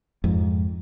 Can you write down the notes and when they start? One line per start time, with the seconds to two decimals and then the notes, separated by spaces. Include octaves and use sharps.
0.24 F2 G#2